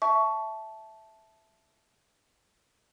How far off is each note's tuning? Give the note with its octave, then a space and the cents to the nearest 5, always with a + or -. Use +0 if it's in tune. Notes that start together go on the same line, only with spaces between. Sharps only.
E5 +0 A5 -10 C#6 +10